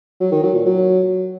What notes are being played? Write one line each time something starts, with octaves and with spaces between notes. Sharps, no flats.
F#3
D#3
F#3
A#2
F#3